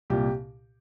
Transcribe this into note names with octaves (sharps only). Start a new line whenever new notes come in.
C2 A#2 G4